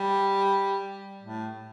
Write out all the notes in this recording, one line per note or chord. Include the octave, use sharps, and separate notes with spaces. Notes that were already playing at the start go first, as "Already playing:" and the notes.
Already playing: G3
A2